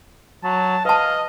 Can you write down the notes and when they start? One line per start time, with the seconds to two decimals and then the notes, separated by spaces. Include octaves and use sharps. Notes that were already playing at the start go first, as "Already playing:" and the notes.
0.44 F#3 A5
0.85 B4 D#5 F5 A5